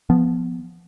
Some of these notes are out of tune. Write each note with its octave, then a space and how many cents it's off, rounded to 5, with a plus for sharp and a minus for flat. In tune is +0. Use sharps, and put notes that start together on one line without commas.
F3 +0 B3 +0